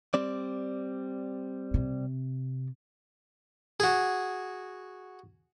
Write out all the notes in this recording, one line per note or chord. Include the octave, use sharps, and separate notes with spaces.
G3 C4 D5
C3
F#4 G#4